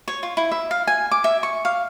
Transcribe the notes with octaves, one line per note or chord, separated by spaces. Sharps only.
C#5
F4
E4
E5
F5
G#5
D6
E5
C#6
F5